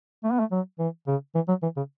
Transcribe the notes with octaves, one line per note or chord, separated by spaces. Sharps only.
A3
B3
A3
F#3
E3
C#3
E3
F#3
E3
C#3